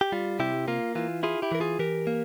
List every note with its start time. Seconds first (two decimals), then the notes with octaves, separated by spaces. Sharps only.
0.01 G4
0.12 G3 F4
0.39 C3 E4 G4
0.68 A#3 F4
0.95 E3 F4
1.23 E4 F4 G#4
1.42 E4 G4
1.52 E3 A#4
1.60 F4 G#4
1.79 E3 G4 A#4
2.07 A#3